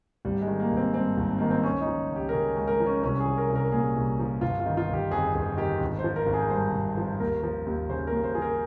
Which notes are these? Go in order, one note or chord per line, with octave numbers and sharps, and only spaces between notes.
G#1 G3
G#3
D#3
A#3
G#1
C4
G2 C4
G#1
D#3 A#3
C4
C#2 C#4
D#4
F3
C#2
G4
A#4
C#3 G#4
C#2
A#4
F3
C#4
C2 C#4
G#4
F3
A#4
C2
A#4
A#2 G#4
C2
F3
G1 F4
F4
D#3
F4
G1 G4
F2 G#4
G1 G#4
D#3 G4
G#1
C5
F3
A#4
G#1
G#4
G2 C5
G#1
F3
D#2 A#4
F3
D#2
C#3 C5
D#2 A#4
C5
F3 G#4
A#4